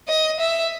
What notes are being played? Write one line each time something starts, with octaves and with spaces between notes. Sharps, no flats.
D#5
E5